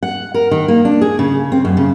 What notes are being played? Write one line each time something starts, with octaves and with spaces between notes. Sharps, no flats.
F#5
A#4
D#3
A#3
D4
G#4
C#3
C4
F#2
C#3